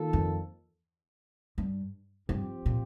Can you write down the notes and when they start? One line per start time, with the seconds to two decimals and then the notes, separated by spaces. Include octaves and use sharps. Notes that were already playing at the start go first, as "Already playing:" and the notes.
Already playing: D#3 A#3 F4 A4
0.13 F2
1.58 G2
2.29 G2 F3 C4 G4
2.66 A#2